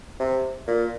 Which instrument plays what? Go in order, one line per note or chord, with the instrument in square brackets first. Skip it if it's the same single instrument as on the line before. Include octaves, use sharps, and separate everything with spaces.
[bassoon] C3
A#2